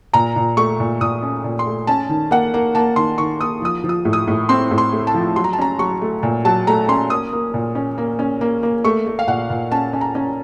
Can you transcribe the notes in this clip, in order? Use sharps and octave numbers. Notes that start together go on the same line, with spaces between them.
A#2 A#5
A#2
A3 C#6
A#2
A#2 D#6
C#4
A#2
C6
A3
C#4 A5
D#3
A#3 F#5
A#3
A#3 A5
D#3 C6
D#3 C#6
A#3 D#6
F3 D#6
F3
D#6
A2
D#6
A2
C4 C6
A2
C6
A3
A5
F3
F#3 C6
A#5
A5
C#4 A#5
F#3 C#6
A3
A#2
F#3 A5
A3 A#5
C#4 C6
A#3 D#6
A#3
A#2
C#4
A#3
C#4
A#3
A#3
A3 C#6
A3
F5
A#2 F#5
A#2
C#4 A5
C#4
A#5
C#4